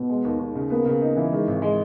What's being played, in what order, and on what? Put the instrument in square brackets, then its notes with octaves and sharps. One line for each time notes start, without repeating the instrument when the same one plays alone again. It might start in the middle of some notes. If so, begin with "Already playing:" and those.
Already playing: [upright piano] B2 [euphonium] B3
[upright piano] G#3
D#2
D#2
C#3
[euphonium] A#3 [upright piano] B3
[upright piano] C#3
D#4
E3
[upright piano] D#3 [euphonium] G#3
[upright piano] G#1
G#3